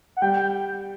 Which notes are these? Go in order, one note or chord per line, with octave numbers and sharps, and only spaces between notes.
F#5
G3 G5
G5